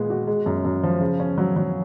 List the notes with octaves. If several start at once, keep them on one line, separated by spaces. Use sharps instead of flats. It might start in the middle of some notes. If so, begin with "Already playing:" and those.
Already playing: A#2 G#3 B3
F#4
G#3
F#2
F#2
F3
C#3
C#4
F#3
F#3